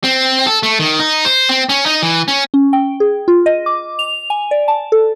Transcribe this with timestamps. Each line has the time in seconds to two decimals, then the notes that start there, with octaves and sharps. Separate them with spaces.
0.04 C4
0.46 A4
0.63 A3
0.79 D#3
0.99 D#4
1.25 C5
1.49 C4
1.69 C#4
1.86 D#4
2.02 E3
2.28 C#4
2.54 C#4
2.73 G5
3.00 G#4
3.28 F4
3.46 D#5
3.66 D6
3.99 F7
4.30 G#5
4.51 D5
4.68 A5
4.92 A4